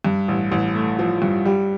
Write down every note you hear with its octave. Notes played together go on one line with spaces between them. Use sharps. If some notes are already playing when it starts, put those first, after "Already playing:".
G2
A1
A1
A3
F3
G2
G3